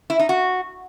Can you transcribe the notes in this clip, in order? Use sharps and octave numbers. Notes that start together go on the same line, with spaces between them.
E4
D#4
F#4